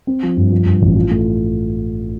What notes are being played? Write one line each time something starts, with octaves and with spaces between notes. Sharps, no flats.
C4
F3
G2
F3
G2
A1
F4
A3